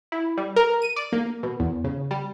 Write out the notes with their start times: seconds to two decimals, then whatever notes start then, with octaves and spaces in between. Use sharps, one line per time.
0.12 E4
0.37 G3
0.56 A#4
0.82 D#7
0.96 D5
1.12 A#3
1.43 B2
1.60 E2
1.84 C#3
2.11 G3